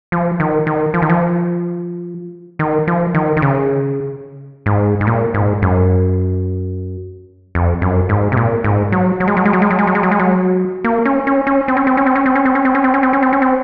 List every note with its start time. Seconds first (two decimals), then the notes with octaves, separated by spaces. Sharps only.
0.12 F3
0.40 D#3
0.67 D#3
0.94 F3
1.02 D#3
1.10 F3
2.59 D#3
2.87 F3
3.15 D#3
3.37 D#3
3.42 C#3
4.66 G#2
5.01 G#2
5.07 A#2
5.34 G#2
5.62 F#2
7.55 F2
7.82 F#2
8.09 G#2
8.32 C3
8.37 A#2
8.64 G#2
8.92 F#3
9.20 F#3
9.28 G#3
9.37 F#3
9.46 G#3
9.53 F#3
9.62 G#3
9.71 F#3
9.79 G#3
9.87 F#3
9.95 G#3
10.03 F#3
10.11 G#3
10.19 F#3
10.84 A#3
11.05 C#4
11.27 C#4
11.47 C#4
11.68 C4
11.77 C#4
11.87 C4
11.97 C#4
12.06 C4
12.16 C#4
12.26 C4
12.35 C#4
12.45 C4
12.55 C#4
12.65 C4
12.75 C#4
12.84 C4
12.94 C#4
13.03 C4
13.13 C#4
13.23 C4
13.33 C#4
13.42 C4